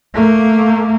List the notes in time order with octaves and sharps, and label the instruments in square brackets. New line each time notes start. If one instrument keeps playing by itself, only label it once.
[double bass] A3 A#3